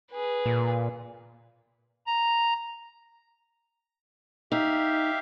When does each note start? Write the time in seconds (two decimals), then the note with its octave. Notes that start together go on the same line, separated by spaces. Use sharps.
0.12 G#4 B4
0.46 A#2
2.07 A#5
4.52 D#4 G4 E5 F5